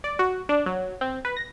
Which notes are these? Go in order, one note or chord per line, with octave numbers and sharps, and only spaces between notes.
D5
F#4
D4
F#3
C4
B4
A#6